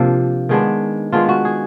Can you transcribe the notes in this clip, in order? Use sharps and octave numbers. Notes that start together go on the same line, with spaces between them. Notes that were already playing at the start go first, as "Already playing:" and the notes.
Already playing: C3 F3 A#3 D4
D#3 G#3 B3 D4
D#3 G#3 B3 D4 F4
F#4
G#4